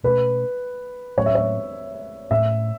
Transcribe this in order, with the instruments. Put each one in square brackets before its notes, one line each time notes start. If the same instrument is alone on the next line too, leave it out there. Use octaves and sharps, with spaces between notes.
[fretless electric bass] B2 A3 C#4 [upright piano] B4
[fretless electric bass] A2 F#3 A3 C#4 [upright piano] C#5
[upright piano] E5
C#5
[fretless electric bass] A2 A3 C#4 [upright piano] E5